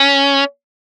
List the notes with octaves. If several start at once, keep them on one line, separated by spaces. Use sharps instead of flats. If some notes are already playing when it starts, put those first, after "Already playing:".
Already playing: C#4